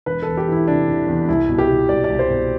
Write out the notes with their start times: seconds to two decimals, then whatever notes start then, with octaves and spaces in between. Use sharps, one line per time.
0.06 E1 B4
0.22 E2 A4
0.37 G4
0.47 E3
0.52 E4
0.68 C3 D4
0.88 E1
1.08 E2
1.28 C2 E4
1.49 B2
1.58 G4
1.69 B2
1.89 C2 D5
2.04 D5
2.09 C2
2.19 C5
2.30 B2